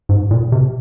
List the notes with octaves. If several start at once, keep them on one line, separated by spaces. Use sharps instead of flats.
G#2
A#2
C3